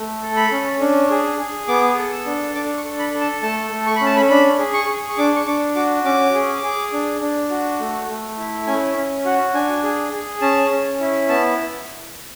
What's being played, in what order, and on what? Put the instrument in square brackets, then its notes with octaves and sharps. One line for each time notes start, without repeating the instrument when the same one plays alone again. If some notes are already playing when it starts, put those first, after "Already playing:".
Already playing: [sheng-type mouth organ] A3
A4
B5
C#4
D4
G#4
G#4
B3 D6
A4
E6
D4
D4 D6
C#6
A4
B5
A4
A5
A3 A5
A3
C#6
B5
C#4
A5
B5
D4 B5
G#4
C#6
G#4
C#6
D4 D6
C#6
D4 D6
F#4 D6
C#4 D6
G#4
G#4
D4
D4
F#4
A3
A3
E4
C#4 G#5
C#4
F#4 F#5
D4 G#5
G#4
G#4
C#4 A5
C#4
E4
B3 A5